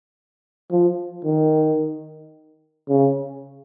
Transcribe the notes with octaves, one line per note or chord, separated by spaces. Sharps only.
F3
D#3
C#3